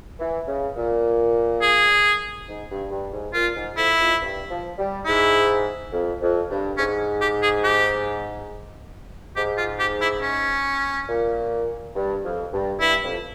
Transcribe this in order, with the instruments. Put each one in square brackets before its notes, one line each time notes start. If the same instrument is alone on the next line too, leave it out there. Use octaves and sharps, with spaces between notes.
[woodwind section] E3
C#3
A#2
[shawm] G#4
[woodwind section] G#2
G2
G2
G#2
[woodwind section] A#2 [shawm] F4
[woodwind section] G#2
[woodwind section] F2 [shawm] E4
[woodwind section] F2
G2
F3
G3
[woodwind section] G#2 [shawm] E4
[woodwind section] F2
F2
G2
[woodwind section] G#2 [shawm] C#4
[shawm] G4
G#4
G4
[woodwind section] G#2 [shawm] G4
[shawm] F4
G4
E4
C#4
[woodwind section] A#2
G2
F2
G2
[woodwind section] G2 [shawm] E4
[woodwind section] F2